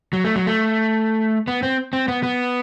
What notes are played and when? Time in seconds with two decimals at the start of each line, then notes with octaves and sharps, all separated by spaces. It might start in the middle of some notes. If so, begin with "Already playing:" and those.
0.13 F#3
0.24 A3
0.36 F#3
0.46 A3
1.47 B3
1.63 C4
1.93 C4
2.08 B3
2.23 B3